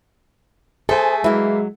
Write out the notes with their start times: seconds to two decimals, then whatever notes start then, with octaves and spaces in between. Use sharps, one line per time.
0.89 A3 G#4 A4 C5 G#5
1.24 E3 F#3 G#3 A#3 E4